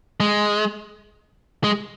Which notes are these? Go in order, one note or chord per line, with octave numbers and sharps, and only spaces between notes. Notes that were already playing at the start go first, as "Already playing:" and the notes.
G#3
G#3